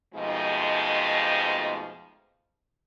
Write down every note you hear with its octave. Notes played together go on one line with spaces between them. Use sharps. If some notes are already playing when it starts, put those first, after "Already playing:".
F2 B2 F3 G#3 A3 D#4